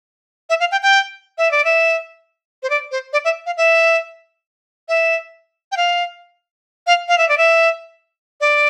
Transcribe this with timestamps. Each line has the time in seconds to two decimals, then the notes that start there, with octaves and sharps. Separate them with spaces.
0.50 E5
0.60 F5
0.72 G5
0.83 G5
1.38 E5
1.51 D5
1.65 E5
2.63 C5
2.70 D5
2.91 C5
3.13 D5
3.25 E5
3.46 F5
3.57 E5
4.89 E5
5.72 G5
5.77 F5
6.87 F5
7.08 F5
7.18 E5
7.29 D5
7.38 E5
8.41 D5